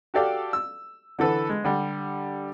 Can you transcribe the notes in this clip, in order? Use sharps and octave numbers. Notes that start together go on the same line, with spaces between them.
F#4 G4 A4 D5 F5 G5
E6
D3 E3 A4 B4
G#3
D3 G3